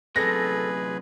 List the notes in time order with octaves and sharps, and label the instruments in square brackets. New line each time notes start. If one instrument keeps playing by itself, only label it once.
[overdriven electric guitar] F#2 C3 [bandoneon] G#4 B4 [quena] A4 [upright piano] A#6